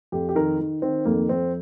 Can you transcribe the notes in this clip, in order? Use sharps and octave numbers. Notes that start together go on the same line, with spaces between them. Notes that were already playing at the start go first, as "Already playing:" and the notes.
F2 G4
G4
D#3 A#4
D#3
D#3 C4
F2 A#3
F2 C4